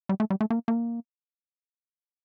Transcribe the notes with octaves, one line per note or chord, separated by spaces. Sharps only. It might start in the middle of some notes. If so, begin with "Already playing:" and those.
G3
A3
G3
A3
A#3
A#3